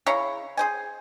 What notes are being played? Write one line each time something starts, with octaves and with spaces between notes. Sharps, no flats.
C#3 E4 C#5 A#5
G#4 C5 G#5